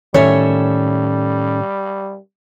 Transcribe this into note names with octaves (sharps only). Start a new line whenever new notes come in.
A2 D#3 G3 C#4 A4 C#5 E5